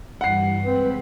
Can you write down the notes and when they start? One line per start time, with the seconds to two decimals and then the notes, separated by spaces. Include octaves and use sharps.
0.21 G2 E3 G3 F#5 C7
0.64 C3 G#3 C4 B4 B5